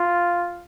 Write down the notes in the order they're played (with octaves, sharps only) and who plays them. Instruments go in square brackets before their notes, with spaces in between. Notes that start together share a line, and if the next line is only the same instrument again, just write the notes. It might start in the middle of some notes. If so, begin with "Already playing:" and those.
Already playing: [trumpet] F4